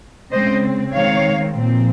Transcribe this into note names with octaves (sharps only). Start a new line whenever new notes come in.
C#3 G#3 C4 C5 D#5
D#3 G#3 C4 C#5 F5
A#2 F3 C4